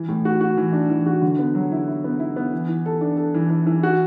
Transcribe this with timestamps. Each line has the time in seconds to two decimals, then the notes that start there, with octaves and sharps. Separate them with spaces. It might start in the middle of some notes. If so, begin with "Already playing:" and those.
Already playing: E3
0.08 A2
0.25 F#4
0.41 F#4
0.57 E3
0.73 D4
0.90 E3
1.06 F#4
1.22 D3
1.39 B3
1.55 F#3
1.72 E4
1.88 E4
2.04 B3
2.20 E4
2.36 B3
2.53 E3
2.68 E3
2.86 A4
3.01 D4
3.17 A4
3.34 E3
3.50 E3
3.66 E3
3.83 F#4